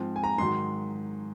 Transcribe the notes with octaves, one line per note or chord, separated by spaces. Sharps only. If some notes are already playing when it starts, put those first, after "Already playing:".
Already playing: G#2 F3 C4
G#5
A#5
G#2 D#3 F#3 C6